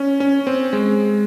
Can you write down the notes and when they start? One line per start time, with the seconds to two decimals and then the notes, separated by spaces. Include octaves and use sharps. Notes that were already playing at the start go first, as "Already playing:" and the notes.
Already playing: C#4
0.20 C#4
0.47 C4
0.73 G#3